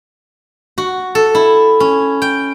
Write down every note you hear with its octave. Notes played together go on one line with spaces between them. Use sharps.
F#4
A4
E4
C#4
G5